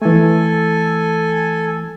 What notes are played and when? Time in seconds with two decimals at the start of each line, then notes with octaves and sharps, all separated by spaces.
0.02 E3 A3 A4 G#5